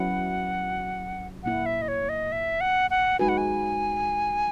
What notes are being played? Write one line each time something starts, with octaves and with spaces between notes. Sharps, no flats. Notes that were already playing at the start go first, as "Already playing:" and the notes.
Already playing: F#3 C#4 E4 B4 F#5
A#2 A#3 E4 F#5
E5
D#5
C#5
D#5
E5
F#5
F#5
G#3 D#4 F#4 B4 G#5
F#5
G#5